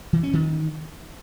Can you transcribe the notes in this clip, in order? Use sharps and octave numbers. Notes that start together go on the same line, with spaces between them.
E3
C#4
D#3